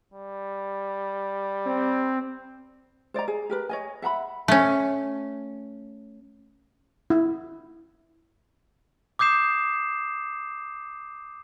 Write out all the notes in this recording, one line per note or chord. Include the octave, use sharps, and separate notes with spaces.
G3
C4
C5 D5 D#5 A#5
G#4
G4 A#4 B4
C#5 D#5 G#5
E5 F#5 A#5 B5
A3 C#4
E4
D6 D#6 G6 C7 E7